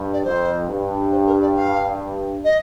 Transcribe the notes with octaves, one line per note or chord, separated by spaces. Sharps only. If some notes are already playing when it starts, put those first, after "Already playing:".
Already playing: G2
D5
F2 C5
G2
C5
A#4
D5
F5
D#5